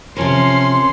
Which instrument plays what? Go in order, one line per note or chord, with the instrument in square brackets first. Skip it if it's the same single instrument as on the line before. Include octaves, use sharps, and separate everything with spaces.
[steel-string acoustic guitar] C3 F3 A#4 [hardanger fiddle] C#4 [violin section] C6